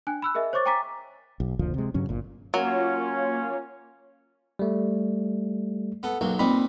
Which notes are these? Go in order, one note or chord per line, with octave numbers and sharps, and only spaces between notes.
D4 G5 G#5 F#6
B5 E6 F#6
G#4 A#4 D#5 E5 G#5
C5 C#5 C#6 D6 A6
G5 G#5 A#5 D6 A6 B6
B1
F#1 D2 A#2 F3
C3 G#3
G2 C#3 F#3 C#4
G1 A#2
F#3 A#3 C#4 F4 C#5
G3 A3
B3 A4
B1 F#3 A#3 G5
A#2 C4 D#4 B5